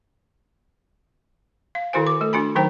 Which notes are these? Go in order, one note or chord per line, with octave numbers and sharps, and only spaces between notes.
F5
D#3 E4 F#4 A4 C5 G#5
D6
A3 A4
D4 F#4 G#5 B5
D#3 F#3 D#4 C5 G5 A#5